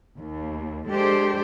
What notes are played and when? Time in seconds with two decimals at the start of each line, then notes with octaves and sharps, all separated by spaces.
0.17 D#2
0.89 G#3 D4 G4 A4 C5